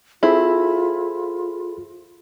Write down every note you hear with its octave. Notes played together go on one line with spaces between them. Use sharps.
C4 E4 F4 G#4 A4 B5